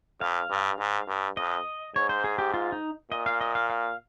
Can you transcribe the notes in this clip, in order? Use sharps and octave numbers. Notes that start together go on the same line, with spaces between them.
F2 F5
G2
G#2
G2
F2 D#5
G#2 C#5
C5
G#4
G4
F4
D#4
A#2 D#5
F5
D#5
F5
F5